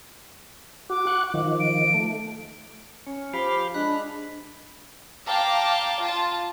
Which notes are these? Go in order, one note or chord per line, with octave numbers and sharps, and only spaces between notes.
F#4 D6
F#5 C#6 F#6
D#3 F3
D7
A3
C#4
F3 G4 F5 B5
G#3 D4 B5 F#6
F5 G5 A5 A#5 D6
F4 A5